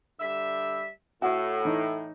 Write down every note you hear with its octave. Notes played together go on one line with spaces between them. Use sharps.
D3 G3 E5
A2 F#4
E3 D#4